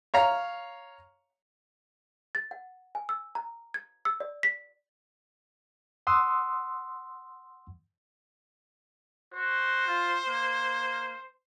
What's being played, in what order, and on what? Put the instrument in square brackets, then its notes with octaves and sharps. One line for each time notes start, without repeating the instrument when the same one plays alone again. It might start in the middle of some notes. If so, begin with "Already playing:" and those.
[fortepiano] C#5 F5 A#5
[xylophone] A6
F#5
G#5
E6
A#5
G#6
E6
D5
B6
[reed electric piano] F#5 C6 D#6 E6
[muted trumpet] F#4 [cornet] C5
[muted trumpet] F4
A#3